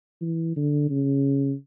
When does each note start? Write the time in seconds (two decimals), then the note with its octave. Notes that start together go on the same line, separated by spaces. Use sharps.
0.21 E3
0.56 D3
0.89 C#3